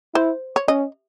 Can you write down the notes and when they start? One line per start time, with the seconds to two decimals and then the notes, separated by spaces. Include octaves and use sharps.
0.15 E4 C5
0.56 C#5
0.68 C#4 D#5